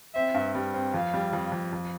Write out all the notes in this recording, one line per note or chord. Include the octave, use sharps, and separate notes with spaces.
C4 E5
G2
G3
C4
F2 F5
G3
F2
F2
F2